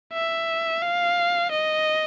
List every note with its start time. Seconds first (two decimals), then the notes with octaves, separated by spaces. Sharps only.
0.13 E5
0.82 F5
1.51 D#5